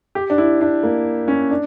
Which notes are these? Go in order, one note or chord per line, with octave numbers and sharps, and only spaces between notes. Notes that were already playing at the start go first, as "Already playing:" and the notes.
G4
D4
E4
D4
A#3
C#4
D4